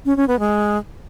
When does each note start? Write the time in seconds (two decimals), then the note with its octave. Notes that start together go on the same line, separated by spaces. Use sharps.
0.06 C#4
0.17 C#4
0.28 B3
0.40 G#3